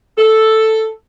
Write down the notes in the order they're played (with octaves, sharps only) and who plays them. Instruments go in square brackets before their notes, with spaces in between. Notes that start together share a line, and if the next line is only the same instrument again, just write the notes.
[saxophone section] A4